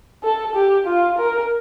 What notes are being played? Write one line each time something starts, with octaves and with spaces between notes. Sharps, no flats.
A4
G4
F4
A#4